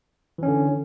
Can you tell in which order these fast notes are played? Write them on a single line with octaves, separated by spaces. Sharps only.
E3 C#4 D3